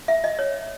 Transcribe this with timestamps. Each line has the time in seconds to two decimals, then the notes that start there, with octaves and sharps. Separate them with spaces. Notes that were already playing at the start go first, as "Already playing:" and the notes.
0.08 E5
0.24 D#5
0.39 C#5